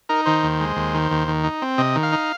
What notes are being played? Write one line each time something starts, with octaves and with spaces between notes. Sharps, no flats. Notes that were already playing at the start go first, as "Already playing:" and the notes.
D#4 A#4
D#3 C5
D#2
G#3
D#2
D#3
D#2
D#3
D#4
C4
C3 D#5
D#3
F5
D#4